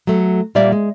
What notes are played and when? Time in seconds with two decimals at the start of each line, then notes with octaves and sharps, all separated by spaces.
0.07 F#3 A3
0.55 A#2 G3 A#3 D5 E5
0.72 G#3